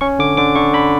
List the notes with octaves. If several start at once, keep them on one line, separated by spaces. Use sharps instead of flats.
C#4 C#6
D3 D6
D3 D6
D3 C#6
D3 B5